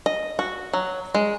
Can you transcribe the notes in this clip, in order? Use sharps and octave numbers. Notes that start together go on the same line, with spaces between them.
D#5
F#4
F#3
G#3